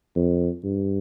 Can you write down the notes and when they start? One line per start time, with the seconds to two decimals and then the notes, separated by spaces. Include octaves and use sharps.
0.16 F2
0.64 G2